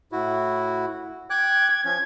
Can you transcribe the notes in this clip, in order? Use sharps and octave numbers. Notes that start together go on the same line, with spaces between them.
A2 E4 F#4
G5 D6 F#6 G#6
F3 C#4 G#6